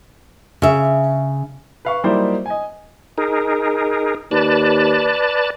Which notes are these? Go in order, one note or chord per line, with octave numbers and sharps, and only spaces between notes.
C#3 E5
B4 F5 C#6
F#3 G3 A#3 D#4 E4 C5
D#5 G#5
D#4 G#4 A#4
D#2 B4 D5 A5